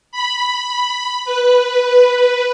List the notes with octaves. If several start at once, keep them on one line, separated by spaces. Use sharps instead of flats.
B5
B4